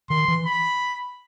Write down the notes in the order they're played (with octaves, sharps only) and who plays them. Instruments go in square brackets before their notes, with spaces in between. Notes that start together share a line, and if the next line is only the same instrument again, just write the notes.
[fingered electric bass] D#3 [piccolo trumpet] C6
[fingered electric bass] E3
[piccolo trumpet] B5